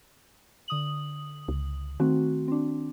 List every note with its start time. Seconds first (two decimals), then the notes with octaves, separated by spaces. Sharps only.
0.68 D3 D#6 F#7
1.48 C#2
2.00 D#3 A3 C4 F#4
2.48 C4 D4